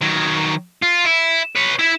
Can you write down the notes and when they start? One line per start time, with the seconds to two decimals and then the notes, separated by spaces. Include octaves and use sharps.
0.01 D#3 F#3
0.82 F4
1.05 E4
1.56 B4 C#5
1.79 E4 E5